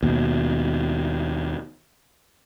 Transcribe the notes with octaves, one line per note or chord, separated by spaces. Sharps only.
D#2 B2